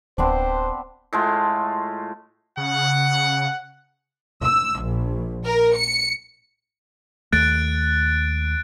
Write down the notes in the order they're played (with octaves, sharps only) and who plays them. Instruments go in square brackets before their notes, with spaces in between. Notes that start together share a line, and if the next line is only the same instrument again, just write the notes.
[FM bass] D1 [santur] B3 C4 D4 [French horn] C5
[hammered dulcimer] A2 G#3 A3 F4
[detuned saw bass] C#3 [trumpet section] F#5
[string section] E6
A#1
A#4
C#7
[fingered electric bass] D#2 A3 [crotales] F#6 A6 D7